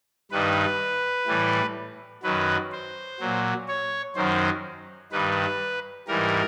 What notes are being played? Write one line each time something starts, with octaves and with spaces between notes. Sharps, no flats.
G2 D#3 G3 B4
A2 E3 G3
F#2 D#3 F#3 B4
C5
A#2 F#3
C#5
F#2 D#3 F#3 C5
G2 D#3 G3 B4
G#2 E3 G3 A#4